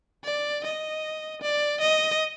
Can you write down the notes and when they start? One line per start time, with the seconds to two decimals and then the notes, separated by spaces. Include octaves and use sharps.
0.24 D5
0.64 D#5
1.42 D5
1.81 D#5